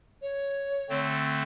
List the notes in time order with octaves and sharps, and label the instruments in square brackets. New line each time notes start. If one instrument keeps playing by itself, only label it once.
[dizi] C#5
[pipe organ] D3 A3 C4